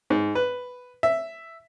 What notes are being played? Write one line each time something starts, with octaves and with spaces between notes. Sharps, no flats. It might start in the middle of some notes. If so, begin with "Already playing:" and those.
G#2
B4
E5